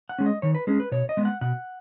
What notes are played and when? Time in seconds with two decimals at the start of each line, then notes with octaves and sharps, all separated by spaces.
0.09 F#5
0.19 G#3 C#4
0.26 D#5
0.42 D#3 C#5
0.55 B4
0.67 G#3 C#4 G#4
0.80 B4
0.92 B2 C#5
1.09 D#5
1.17 G#3 B3
1.25 F#5
1.41 B2 F#5